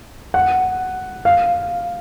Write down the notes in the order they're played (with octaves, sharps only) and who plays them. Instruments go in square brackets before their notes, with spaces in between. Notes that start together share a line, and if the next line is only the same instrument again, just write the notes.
[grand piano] F#5
F5